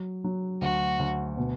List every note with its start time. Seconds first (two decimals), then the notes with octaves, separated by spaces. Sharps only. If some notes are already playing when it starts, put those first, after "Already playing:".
Already playing: F#3
0.24 F#3
0.61 D2 F#4
0.99 D2
1.38 B2